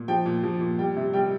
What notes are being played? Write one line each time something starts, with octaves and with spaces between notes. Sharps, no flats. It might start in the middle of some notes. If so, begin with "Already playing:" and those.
Already playing: A#2
F3 G5
A#2
F3
A#2
G3 G5
C3
G3 G5